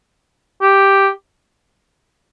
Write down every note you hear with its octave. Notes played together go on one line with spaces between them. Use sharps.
G4